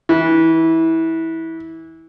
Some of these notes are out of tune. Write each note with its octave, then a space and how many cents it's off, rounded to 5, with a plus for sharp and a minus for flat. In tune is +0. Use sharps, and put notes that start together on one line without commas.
E3 -20